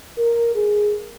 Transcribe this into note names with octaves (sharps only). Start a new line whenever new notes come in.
A#4
G#4